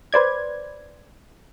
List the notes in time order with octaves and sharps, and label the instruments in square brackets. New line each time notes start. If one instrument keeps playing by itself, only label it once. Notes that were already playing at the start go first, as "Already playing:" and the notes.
[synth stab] B4 C5 D5 G#6